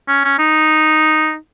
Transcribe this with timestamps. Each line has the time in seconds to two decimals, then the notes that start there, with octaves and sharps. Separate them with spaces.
0.08 C#4
0.24 C#4
0.39 D#4